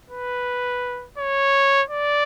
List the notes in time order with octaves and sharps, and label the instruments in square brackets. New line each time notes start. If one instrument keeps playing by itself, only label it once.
[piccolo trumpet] B4
C#5
D5